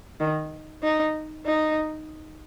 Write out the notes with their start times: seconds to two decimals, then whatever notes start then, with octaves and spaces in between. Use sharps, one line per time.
0.20 D#3
0.83 D#4
1.46 D#4